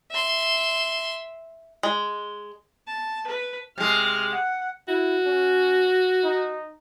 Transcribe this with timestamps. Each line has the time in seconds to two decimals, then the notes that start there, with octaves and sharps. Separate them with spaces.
0.12 E5 C6
1.83 G#3
2.87 A5
3.27 B4
3.78 C3 G#3 F6
4.33 F#5
4.88 E4 F#4
5.25 C#4
6.24 D#4